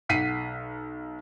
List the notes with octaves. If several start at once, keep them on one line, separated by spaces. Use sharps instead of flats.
B1 F#5 B6 C7 D#7